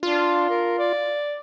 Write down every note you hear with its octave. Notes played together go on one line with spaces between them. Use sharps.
D4 F4
A#4
D5